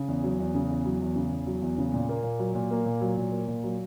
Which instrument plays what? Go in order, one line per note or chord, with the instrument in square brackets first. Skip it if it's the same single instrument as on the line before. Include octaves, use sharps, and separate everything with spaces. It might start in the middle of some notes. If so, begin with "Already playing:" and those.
Already playing: [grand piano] C#3
E2
F#3
E2
C#3
E2
F#3
E2
C#3
E2
F#3
E2
C#3
A#2
A#3
A#2
F#3
A#2
A#3
A#2
F#3
A#2
A#3
A#2
F#3